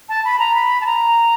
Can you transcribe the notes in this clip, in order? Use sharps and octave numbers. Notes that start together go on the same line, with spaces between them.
A5
B5
A#5
B5
A5
A#5